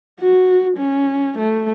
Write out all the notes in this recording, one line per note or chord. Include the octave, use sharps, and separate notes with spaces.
F#4
C#4
A3